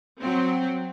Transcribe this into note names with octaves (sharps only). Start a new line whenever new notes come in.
F#3 C4